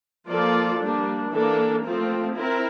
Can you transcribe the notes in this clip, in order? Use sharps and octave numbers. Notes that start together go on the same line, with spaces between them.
F3 A#3 F4 A4 D5
G3 A#3 D4
E3 A#3 D4 A4
F3 A3 C4 F4
C4 E4 A#4